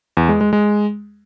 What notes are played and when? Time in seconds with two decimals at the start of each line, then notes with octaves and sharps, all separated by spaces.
0.17 E2
0.29 G#3
0.41 G#3
0.53 G#3